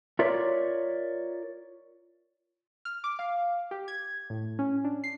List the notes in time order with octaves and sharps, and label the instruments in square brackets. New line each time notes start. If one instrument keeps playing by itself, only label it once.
[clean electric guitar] F4 A#4 C#5 D5 E5
[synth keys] F6
D6
F5
G4
G#6
A2
C#4
D4
C7